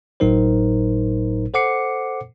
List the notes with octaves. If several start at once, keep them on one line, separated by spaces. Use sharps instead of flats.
G1 A2 F#3 D#4 A#4 C5
A4 C5 F#5 D6 C7 C#7